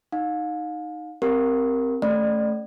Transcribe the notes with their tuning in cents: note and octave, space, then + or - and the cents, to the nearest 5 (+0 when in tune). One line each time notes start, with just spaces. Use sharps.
D#4 +0 F5 +35
C4 +0 G4 +0 A#4 +0
A3 -5 C#4 +0 D5 +30